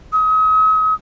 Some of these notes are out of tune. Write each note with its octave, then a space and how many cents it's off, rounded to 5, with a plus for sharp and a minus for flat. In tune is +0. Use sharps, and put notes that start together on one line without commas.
D#6 +40